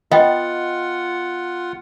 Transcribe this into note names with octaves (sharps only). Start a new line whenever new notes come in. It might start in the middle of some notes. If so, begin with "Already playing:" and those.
B3 F4 D#5 F#5 G5